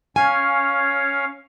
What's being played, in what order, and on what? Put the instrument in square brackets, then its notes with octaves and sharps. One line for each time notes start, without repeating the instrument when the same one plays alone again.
[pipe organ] C#4 C#5 F5 [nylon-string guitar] G#5